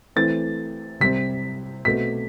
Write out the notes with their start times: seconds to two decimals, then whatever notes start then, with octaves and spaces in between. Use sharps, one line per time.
0.16 E3 A3 C4 A6
1.00 C3 G3 C4 B6
1.85 B2 A3 C4 B6